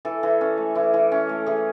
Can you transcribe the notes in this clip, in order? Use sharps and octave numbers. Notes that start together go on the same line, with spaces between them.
E3 A4
E3
C#4
A3
E3
E3
C#4
A3
E3 G#4